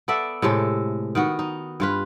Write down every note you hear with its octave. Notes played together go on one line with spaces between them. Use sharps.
B3 A4 D5 E5
A2 C3 G#3 A4
D#3 B3 F#4
D#4
G2 F4 B4